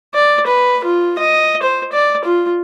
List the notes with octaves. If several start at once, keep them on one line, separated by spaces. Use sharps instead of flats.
D5
B4
F4
D#5
C5
D5
F4